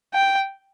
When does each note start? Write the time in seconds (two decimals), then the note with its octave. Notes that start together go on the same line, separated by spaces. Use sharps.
0.14 G5